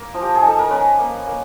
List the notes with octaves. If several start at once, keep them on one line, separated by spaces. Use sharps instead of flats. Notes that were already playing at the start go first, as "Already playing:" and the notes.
Already playing: A#3 A#4
F3
G4
G#4
D#4 A4
A#4
C#4 B4
A#3
A#3